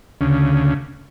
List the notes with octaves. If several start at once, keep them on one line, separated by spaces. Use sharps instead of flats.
D2 C#3